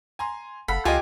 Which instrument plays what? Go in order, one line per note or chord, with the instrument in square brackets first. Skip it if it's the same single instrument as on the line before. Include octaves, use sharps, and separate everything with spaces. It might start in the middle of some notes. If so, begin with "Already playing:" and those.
[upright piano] G#5 A#5 C6
[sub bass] F#1 [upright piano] A4 F5 F#5 [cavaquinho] B5
[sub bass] C#2 [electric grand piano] F4 D#5 [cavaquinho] G4 G#5